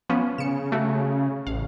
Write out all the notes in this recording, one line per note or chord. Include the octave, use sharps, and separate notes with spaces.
F3 B3 C#4
C#3 C#7 E7
A3 F#4
A1 F5